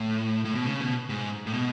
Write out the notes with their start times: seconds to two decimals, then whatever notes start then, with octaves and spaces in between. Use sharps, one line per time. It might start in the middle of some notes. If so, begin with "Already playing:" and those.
Already playing: A2
0.45 A2
0.55 B2
0.66 C#3
0.81 B2
1.10 G#2
1.46 A2
1.53 B2